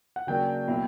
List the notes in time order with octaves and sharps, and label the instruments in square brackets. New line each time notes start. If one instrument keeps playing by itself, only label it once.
[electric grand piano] F#5
[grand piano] C#3 F#3 A#3 D4 F#4 [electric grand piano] G5
[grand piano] B2 F#3 A#3 E4 A#4